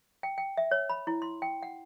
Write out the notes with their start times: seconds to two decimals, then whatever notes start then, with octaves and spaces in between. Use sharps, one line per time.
0.23 G5
0.38 G5
0.57 E5
0.71 C#5
0.90 B5
1.07 E4
1.22 C6
1.42 G5
1.63 F#5